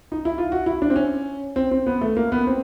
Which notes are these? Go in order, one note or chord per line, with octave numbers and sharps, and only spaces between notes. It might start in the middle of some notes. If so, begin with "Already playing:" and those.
D#4
E4
F4
F#4
E4
D4
C4
C#4
C4
C4
B3
A3
A#3
B3
C4